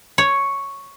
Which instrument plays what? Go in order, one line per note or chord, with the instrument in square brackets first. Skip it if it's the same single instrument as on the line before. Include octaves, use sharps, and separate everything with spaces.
[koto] C#5